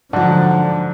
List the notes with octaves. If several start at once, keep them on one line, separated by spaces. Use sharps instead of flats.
G#2 D3 F3 F#3 D5 F#5 A5